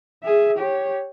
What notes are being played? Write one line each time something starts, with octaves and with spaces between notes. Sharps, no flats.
G#4 E5
G4 C#5